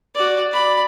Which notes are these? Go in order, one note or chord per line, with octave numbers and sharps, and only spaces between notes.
F#4 D5
D5 B5